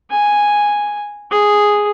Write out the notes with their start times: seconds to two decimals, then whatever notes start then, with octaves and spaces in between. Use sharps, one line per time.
0.11 G#5
1.31 G#4